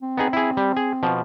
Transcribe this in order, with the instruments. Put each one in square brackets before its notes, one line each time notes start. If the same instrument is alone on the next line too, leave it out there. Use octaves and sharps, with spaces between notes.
[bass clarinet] C4
[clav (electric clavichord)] B3 D#4 G#4
E4 G#4
G3
G#4
B2 F3